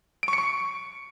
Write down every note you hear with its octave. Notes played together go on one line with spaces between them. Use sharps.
D7
C#6
C#7
C#6